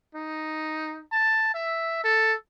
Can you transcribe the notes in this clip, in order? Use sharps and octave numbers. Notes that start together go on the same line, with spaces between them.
D#4
A5
E5
A4